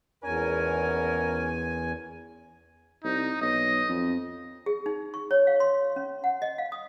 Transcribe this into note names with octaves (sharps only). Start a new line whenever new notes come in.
G#1 E2 C#4 A#4 G#5
C2 D#4
B1 D#5
F2
G#4
D#4
C#6
C#5
F5
C6
C#4
F#5
D#5
F5
D#6